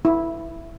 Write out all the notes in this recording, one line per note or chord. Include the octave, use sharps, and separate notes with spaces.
E4